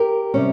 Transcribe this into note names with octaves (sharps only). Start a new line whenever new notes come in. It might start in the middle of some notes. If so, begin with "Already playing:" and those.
Already playing: G4 A#4
C3 G3 C#4